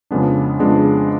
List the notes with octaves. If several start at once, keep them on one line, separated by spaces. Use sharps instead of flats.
F2 C#3 G#3 B3 D4
F2 C#3 G#3 B3 D4